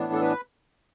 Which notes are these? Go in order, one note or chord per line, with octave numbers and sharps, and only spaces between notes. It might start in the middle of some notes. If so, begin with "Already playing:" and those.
Already playing: A2 E3 B3 D4
A4
B4